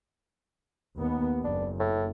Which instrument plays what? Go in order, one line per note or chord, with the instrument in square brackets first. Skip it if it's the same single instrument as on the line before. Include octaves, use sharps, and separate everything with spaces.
[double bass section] D#2 B3
[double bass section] F#1 [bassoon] D4
[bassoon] A2